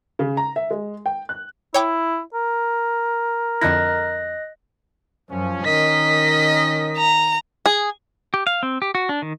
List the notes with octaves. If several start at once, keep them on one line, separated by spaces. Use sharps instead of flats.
C#3
A#5
E5
G#3
G5
F#6
E4 C#5 G5 D6
A#4
F2 D3 E4 D#5 F#6 A#6
F#2 F3 C#4
D#3 C#4 A#4 D#5 B6
A#5
G#4
G4
F5
C4
G4
F#4
D4
D#3